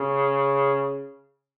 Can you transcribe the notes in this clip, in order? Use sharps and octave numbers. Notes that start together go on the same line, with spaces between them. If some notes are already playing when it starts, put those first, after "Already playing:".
Already playing: C#3